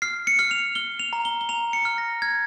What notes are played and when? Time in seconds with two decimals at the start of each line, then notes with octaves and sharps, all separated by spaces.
0.02 F6 C7
0.27 C#7
0.39 F6
0.51 F7
0.75 F6 G7
1.00 F7
1.13 A#5
1.25 G7
1.41 G7
1.49 A#5 F7
1.73 C#7
1.85 F6
1.98 A#6
2.22 F6 G#6